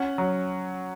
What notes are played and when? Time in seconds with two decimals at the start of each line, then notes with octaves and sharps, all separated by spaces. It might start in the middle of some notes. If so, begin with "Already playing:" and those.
Already playing: C#4 F#5
0.18 F#3